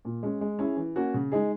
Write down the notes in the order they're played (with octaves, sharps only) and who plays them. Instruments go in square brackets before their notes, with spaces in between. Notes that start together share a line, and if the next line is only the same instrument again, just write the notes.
[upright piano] A#2
G#3 C#4
G#3
C#4 E4 G#4
E3
A#3 C#4 F#4
C#3
G#3 D#4 G#4